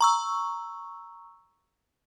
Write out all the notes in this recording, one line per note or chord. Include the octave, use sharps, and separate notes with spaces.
A#5 C#6 E6